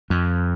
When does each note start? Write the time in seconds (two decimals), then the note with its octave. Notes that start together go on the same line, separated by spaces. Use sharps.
0.10 F2